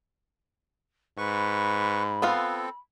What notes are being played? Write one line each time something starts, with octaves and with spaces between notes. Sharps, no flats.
G#2 B4 B5 C#6
B3 C4 F4 A4 F5